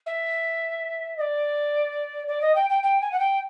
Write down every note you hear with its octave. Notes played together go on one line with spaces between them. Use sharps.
E5
D#5
D5
D5
D#5
G5
G5
G5
G#5
F#5
G5